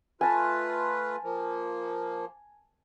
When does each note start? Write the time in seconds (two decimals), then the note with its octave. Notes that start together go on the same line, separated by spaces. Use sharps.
0.21 A3 F4 B4 G#5 A5
1.24 F3 A#3